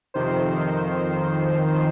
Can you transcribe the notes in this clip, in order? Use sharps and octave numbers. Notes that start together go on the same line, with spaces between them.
F2 C3 D#3 C5
F2 D#3